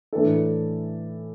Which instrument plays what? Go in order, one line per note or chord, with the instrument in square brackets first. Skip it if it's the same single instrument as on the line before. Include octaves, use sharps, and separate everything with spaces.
[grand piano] A2 E3 D4 A4